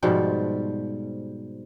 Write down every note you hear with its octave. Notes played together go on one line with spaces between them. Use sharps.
G#2 B2 F3 G3